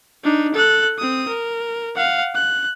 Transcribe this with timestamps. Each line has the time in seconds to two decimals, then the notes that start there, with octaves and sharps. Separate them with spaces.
0.24 D4 D#4
0.54 A4 F#6
0.99 C4 D#6
1.28 A#4
1.95 F5 F#5
2.35 F#6